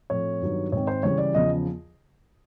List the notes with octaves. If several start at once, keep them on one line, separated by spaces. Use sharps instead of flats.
A2 F3 A3 C4 C#5
G2 D#3 F#3 B3
G#2 D#3 G#3 C4 C#5
C5
C#3 E3 G3 C#5
D5
E2 C#3 F3 D#5